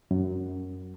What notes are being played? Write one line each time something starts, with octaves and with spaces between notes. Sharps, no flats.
F#2